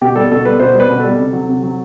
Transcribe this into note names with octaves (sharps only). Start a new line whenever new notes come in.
B2 G4
G3 A4
B2 A4
G3 B4
B2 C5
G3
B4
B2
G3 A4
C3
F#3
C3
F#3